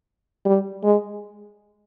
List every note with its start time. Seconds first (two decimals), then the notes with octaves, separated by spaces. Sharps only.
0.45 G3
0.84 G#3